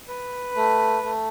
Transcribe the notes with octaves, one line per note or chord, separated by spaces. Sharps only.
B4
A3
A3